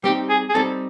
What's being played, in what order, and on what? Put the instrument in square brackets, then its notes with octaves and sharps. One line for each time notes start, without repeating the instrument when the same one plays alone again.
[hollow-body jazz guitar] G3 C4 D#4 [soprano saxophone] G4
[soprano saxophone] G#4
G#4
[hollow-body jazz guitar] G3 C4 D#4 [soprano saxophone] A4